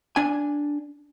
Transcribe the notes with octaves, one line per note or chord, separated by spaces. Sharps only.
D4 G#5